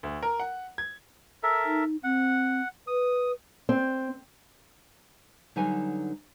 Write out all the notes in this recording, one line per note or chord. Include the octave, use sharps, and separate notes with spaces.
D2
A#4
F#5
G#6
A4 A#4 E5
D#4
C4 F#5
B4 D#6
C4
D3 F#3 G3 D#4 B4 G#5